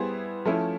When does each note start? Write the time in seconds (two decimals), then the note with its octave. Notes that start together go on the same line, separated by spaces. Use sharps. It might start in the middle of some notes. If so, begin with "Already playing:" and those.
Already playing: G3 B3 E4 G#4 C5
0.45 F3 A3 C#4 E4